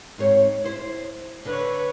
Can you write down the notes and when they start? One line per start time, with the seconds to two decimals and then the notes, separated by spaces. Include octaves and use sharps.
0.18 G#2 C4 C#5
0.64 E4 C5
1.45 D3 B4 C#5